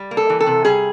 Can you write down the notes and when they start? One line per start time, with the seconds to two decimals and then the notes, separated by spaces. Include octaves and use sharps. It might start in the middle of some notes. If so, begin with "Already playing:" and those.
Already playing: G3
0.11 A#3
0.17 A4
0.30 E3
0.40 A4
0.46 C3
0.65 G3 G#4